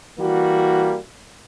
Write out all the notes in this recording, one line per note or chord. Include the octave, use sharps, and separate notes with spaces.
E3 G3 A#3 F#4